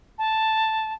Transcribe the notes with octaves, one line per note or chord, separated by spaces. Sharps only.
A5